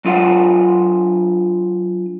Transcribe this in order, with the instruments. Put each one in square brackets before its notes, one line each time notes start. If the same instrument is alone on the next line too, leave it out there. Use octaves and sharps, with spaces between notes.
[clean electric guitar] F#3 D4 F4 F5 F#5